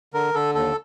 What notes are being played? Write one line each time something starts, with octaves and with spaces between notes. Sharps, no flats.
D3 A#4
D3 A4
D#2 A4